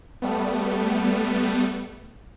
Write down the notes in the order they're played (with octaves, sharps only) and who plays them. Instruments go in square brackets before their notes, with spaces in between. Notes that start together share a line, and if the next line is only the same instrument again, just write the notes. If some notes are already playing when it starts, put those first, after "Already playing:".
[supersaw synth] G3 A3 B3